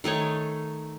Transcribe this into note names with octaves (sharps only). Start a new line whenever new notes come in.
D#3 A3 D#4 C#5